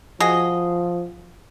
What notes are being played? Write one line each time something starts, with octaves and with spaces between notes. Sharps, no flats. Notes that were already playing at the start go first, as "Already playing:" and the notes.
F3 F#4 G#4 D#5